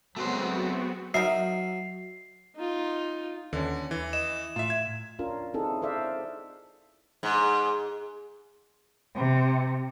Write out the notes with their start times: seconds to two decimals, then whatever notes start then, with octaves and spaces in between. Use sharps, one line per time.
0.17 F#3 G#3 A3 B3 C4 F#4 C5
1.14 F#3 D#4 A#4 E5 C7
2.56 D#4 F4
3.53 D#2 D3 C#4
3.91 E3
4.13 D#5 E7
4.56 A2 F4 E5
4.70 G#6
5.19 C#4 D4 F4 A#4
5.54 C4 D#4 E4 G#4 A4
5.82 A4 C5 D5 E5 F5
5.98 G#4
7.23 G#2
9.16 C3